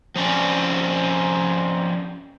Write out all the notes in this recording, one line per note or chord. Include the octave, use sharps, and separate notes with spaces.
F3 C4 C#4 D5